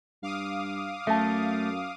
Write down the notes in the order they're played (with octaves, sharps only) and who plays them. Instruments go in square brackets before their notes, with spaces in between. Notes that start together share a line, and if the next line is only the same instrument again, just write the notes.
[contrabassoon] G2 [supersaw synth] F5 D6 D#6
[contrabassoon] F#2 [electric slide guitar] A3 [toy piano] E5 A5